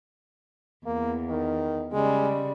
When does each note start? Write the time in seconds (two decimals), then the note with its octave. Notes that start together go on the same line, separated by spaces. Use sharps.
0.86 E2 A#3
1.29 D#3
1.93 C#3 G3 G#3